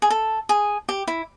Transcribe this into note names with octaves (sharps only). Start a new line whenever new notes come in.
G#4
A4
G#4
G4
E4